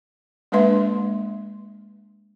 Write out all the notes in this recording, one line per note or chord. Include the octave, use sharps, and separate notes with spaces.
G#3 A#3 D4 B4 E5 C6